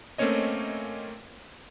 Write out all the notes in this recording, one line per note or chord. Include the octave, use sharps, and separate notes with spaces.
A3 A#3 C4 C#4 C#5 D#5